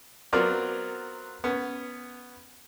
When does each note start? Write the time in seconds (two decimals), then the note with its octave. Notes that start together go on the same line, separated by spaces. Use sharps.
0.33 F#3 B3 C4 F4 A#4 D5
1.44 B3 C#4